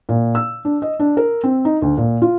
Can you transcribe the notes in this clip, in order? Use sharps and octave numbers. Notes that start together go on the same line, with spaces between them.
A#2
E6
D4
D#5
D4
A#4
C4
D#4
D2
A#2
F4